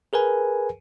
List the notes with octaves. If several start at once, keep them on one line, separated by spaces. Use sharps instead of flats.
G#4 A#4 B4 G#5